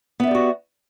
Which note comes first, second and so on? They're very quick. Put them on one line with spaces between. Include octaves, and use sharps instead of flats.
B3 E5 D5 G4 F#4